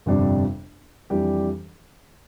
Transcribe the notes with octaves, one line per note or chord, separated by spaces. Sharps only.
G1 F2 C3 G3 D4
F2 E3 G3 D4 G4